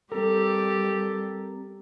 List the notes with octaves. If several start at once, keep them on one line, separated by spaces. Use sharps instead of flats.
G3 C4 G4 A4 A#4